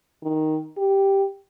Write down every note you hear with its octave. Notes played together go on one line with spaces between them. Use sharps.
D#3
G4